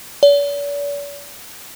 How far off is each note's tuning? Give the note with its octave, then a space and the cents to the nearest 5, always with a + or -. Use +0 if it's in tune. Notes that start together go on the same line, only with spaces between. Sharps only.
D5 -45